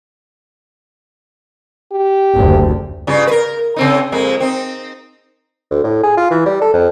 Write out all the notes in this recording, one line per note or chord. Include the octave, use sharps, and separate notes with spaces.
G4
F#1 D2
G2 C#3 F4
A#4 B4
C#3 C4 D#4
F2 G#3 A#3
C4 D#4
D2
A2
G#4
F4
E3
G3
A4
F2